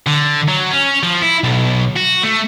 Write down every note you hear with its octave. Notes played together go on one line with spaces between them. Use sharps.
D3
F#3
C#4
F3
E4
B1
F#4
A3